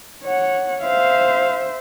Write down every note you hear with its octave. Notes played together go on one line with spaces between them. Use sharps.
C#5 F#5
C5 E5 F5